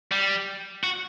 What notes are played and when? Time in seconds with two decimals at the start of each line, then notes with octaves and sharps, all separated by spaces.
0.12 G3
0.83 F#4